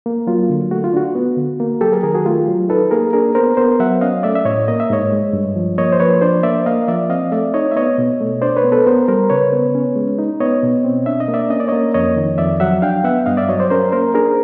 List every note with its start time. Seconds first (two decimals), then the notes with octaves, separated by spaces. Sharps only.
0.06 A#3
0.27 F#3 F4
0.50 D3
0.71 A3 F#4
0.84 F4
0.94 D4 F#4
1.15 B3
1.37 D3
1.60 A#3
1.81 F#3 G4 A4
1.92 G#4 A#4
2.03 D#3 G#4 A#4
2.14 F#4 G#4
2.25 A3 F4 G4
2.48 F#3
2.69 D#4 A4 B4
2.91 A#3 G#4 A#4
3.13 D4 G#4 A#4
3.35 B3 A#4 C5
3.57 B3 A#4 C5
3.80 F#3 E5 F#5
4.01 C#4 D#5 F5
4.23 A3 D5 E5
4.35 E5
4.45 A2 C#5 D#5
4.68 A#3 D#5
4.80 E5
4.90 G#2 C#5 D#5
5.12 G#3
5.33 G2
5.56 F3
5.78 A#3 C#5 D#5
5.92 C5
6.00 F3 B4 C#5
6.21 D4 C5 D5
6.43 A#3 D5 E5
6.66 A#3 D#5 F5
6.88 F3 D5 E5
7.10 C4 D#5 F5
7.32 A3 D5 E5
7.54 D#4 C#5 D#5
7.72 E5
7.76 B3 C#5 D#5
7.98 B2
8.21 A3
8.42 D4 C5 D5
8.57 B4 C#5
8.64 B3
8.72 A4 B4
8.86 B3 A#4 C5
9.08 G3 A#4 C5
9.30 C#3 B4 C#5
9.53 B3
9.75 C#4
9.96 G#3
10.19 D#4
10.40 B3 C#5 D#5
10.63 B2
10.84 C4
11.06 D4 E5
11.20 D#5
11.28 A#3
11.34 D5 E5
11.50 C#4 D#5
11.60 D5
11.68 A#3 C#5 D#5
11.94 F2 C#5 D#5
12.16 D#3
12.38 F2 D5 E5
12.60 F#3 E5 F#5
12.82 D4 F5 G5
13.04 B3 E5 F#5
13.26 G2 D#5 F5
13.37 D5 E5
13.49 F#3 C#5 D#5
13.59 C5 D5
13.70 C#4 A#4 C5
13.92 A#3 A#4 C5
14.14 D4 G#4 A#4